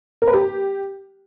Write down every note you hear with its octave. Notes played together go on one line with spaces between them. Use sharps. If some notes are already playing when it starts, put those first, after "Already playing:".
A#4
B4
G4